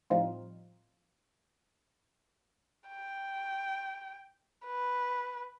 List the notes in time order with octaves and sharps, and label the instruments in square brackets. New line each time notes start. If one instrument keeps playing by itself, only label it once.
[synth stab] A2 F3 G3 C4 D#4 F4
[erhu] G5
B4